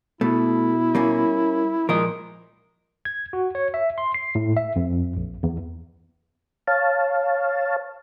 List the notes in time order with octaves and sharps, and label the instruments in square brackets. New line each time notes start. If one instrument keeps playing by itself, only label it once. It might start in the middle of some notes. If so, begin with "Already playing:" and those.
[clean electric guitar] B2 [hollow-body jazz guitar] A3 [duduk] E4
[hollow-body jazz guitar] G3 A#3 C#4
[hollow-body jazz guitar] A#2 F3 [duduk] G#3 [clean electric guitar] A#4 D#5
[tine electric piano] G#6
F#4
C#5
E5
C6
C7
A2
E5
F2
A#1
E2
[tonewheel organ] C#5 F5 A5